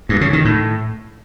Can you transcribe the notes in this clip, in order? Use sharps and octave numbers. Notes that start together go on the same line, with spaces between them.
G2
C#3
D#3
A2